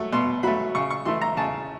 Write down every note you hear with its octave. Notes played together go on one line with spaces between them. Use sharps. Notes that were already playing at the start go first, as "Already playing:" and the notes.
Already playing: F#3 A3
B2 C6
F#3 A3 B5
C#3 C#6
C#6
E3 A3 C6
A#5
C#3 A5